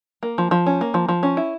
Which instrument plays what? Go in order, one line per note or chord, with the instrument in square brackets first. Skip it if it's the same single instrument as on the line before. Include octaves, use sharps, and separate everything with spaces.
[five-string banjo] A#3
F3
F3
C#4
A#3
F3
F3
C#4
E4